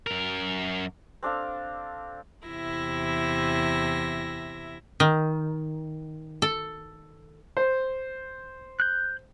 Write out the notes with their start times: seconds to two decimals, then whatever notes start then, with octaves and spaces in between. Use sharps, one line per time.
0.07 F#2 A#4
1.23 C4 D4 A4 F5
2.47 E2 C3 E4 E5 A#6
5.00 D#3
6.42 A4
7.57 C5
8.80 F#6 G6